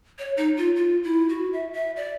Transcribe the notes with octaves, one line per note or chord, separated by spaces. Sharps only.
C#5
D#4
F4
F4
E4
F#4
E5
E5
D5